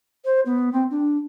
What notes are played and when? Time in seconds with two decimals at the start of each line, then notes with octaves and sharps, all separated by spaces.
0.25 C5
0.46 B3
0.72 C4
0.91 D4